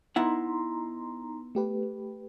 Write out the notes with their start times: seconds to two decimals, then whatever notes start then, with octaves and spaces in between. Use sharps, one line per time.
0.16 B3 D#4 E4 F#5 A#5 C6
1.55 A3 G4 B4